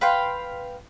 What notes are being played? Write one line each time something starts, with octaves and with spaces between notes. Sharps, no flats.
B4 F5 G5 C6